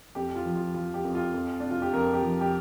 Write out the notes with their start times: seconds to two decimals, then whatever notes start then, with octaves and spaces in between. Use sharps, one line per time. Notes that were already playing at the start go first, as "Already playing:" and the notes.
0.15 F2 G4
0.36 F4
0.45 F3
0.56 F4
0.74 F3 F4
0.94 G4
1.05 F2
1.15 F4
1.34 F2
1.60 C3 D4
1.71 F4
1.82 G4
1.93 F2 A#4
2.12 G4
2.22 F3
2.41 G4